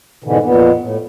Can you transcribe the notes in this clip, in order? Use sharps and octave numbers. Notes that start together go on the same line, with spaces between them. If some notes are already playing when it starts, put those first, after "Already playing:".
G#2 B2 D3 E3
F2 A#2 B3
A2